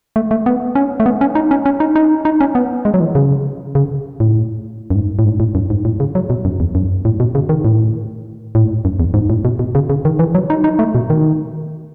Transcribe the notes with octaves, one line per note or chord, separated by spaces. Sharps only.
A3
A3
B3
C#4
A3
B3
C#4
D#4
C#4
C#4
D#4
D#4
D#4
C#4
B3
G#3
F#3
E3
C#3
C#3
A2
F#2
G#2
A2
G#2
A2
F#2
G#2
A2
C#3
F#3
B2
F#2
E2
F#2
A2
B2
C#3
D#3
A2
A2
F#2
E2
G#2
A2
B2
B2
C#3
C#3
D#3
E3
F#3
D#4
D#4
A3
B2
D#3